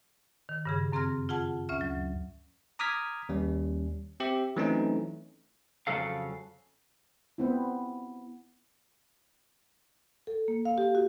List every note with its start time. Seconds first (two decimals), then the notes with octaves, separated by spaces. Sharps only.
0.49 D#3
0.65 G2 C#3 G#4
0.92 F#2 C4 G#4 C6 F6 A#6
1.29 F4 G#4 F#5 A5
1.69 D2 C#4 E5 F6
1.81 F#3
2.79 A#5 D6 D#6 F6 G#6 B6
3.29 D#2 G3 C#4
4.20 C4 G4 E5
4.56 E3 F#3 A3 C4 C#4 D#4
5.87 F2 C#3 F#3 F#4 A4 F5
7.38 B3 C4 E4
10.27 A4
10.48 A#3
10.65 F5
10.78 G4
10.95 F#4